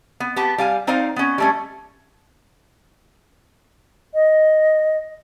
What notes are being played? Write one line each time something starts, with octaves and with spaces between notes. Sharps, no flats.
B3
B3 G4 A5
G3 F5 G#5
C4 D#4 C5 D5 F5
B3 C#4
G3 A3 C#4
D#5